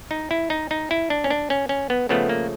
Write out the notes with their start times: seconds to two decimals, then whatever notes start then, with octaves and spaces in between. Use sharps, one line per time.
0.11 D#4
0.31 E4
0.50 D#4
0.71 D#4
0.91 E4
1.10 D4
1.24 C#4
1.30 D4
1.50 C#4
1.69 C#4
1.90 B3
2.09 C#3 F3 A3 B3
2.29 A#3